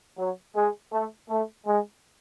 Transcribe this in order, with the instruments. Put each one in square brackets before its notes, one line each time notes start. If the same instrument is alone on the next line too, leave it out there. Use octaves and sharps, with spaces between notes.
[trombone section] F#3
G#3
A3
A3
G#3